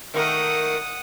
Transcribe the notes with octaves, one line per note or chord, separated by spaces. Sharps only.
D#3 A3 A#4 F#5 D#6